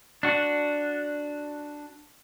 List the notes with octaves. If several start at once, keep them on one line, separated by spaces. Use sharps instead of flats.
D4 F#4